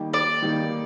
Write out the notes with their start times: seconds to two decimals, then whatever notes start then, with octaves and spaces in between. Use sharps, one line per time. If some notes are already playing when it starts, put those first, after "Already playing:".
Already playing: D#3 G3 A#3 D#4
0.14 D5
0.42 D#3 G3 A#3 D#4